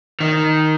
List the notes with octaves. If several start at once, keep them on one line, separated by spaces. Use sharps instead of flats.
D#3